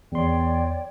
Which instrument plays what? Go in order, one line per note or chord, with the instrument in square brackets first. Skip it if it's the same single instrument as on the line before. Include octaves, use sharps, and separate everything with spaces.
[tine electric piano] E2 C6 [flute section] C#5 D5 G5